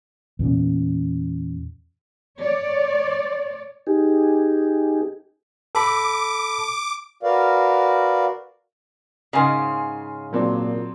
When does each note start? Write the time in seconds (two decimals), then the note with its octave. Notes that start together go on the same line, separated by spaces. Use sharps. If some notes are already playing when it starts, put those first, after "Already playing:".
0.39 E2 A#2 C#4
2.39 C#5 D5
3.87 D#4 G4 G#4
5.75 A4 B5 D6
7.23 F#4 A#4 B4 D5 F5
9.33 G#2 C#3 A#4 G#5 C6
10.33 A#2 F#3 C4 D4